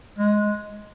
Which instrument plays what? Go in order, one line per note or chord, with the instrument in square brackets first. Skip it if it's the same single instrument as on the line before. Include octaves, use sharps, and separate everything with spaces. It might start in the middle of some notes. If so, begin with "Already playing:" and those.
[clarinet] G#3